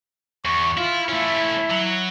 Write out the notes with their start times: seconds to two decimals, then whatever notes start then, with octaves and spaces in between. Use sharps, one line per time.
0.45 E2 C#6
0.77 E4 F4
1.09 A3 C#4 E4
1.70 F#3